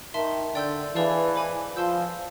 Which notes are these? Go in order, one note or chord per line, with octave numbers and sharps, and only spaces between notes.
D#3 E5 A5 C6
D3 D5 G5 C6 E6 G6
E3 G#4 B4 D5 F5 A5
C5 D#5 G#5 B5 D6
F3 F5 A5 C6 E6 G6